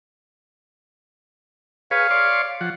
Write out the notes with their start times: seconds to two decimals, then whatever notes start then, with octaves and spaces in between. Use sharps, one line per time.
1.91 G#4 B4 C#5 F5
2.11 C#5 D5 C6
2.61 F3 F#5